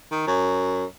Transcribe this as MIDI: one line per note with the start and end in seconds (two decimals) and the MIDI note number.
0.11 0.24 51
0.27 0.85 42